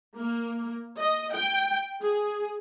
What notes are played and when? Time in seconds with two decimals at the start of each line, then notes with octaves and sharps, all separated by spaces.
0.16 A#3
0.97 D#5
1.32 G5
2.00 G#4